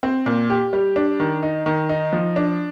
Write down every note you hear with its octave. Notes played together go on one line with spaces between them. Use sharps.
C4
A#2
G4
G3
D4
D#3
D#4
D#3
D#4
F3
D4